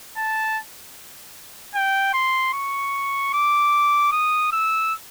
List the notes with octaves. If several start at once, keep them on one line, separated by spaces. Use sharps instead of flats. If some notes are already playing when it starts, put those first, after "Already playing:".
A5
G5
C6
C#6
D6
D#6
E6